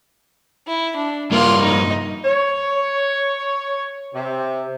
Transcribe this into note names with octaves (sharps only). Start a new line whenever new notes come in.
E4
D4
G2 A#3 F4 C6
D#4 D#5
C#5
C3